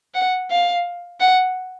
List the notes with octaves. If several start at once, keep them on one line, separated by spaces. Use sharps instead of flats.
F#5
F5
F#5